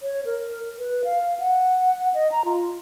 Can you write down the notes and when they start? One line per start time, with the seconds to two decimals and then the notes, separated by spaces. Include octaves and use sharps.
0.01 C#5
0.25 A#4
0.79 B4
1.05 F5
1.40 F#5
2.14 D#5
2.32 A#5
2.45 F4